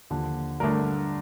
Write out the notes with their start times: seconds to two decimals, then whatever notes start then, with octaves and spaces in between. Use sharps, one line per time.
0.10 D#2 D3 F3
0.60 G2 D3 A3 D4 A#4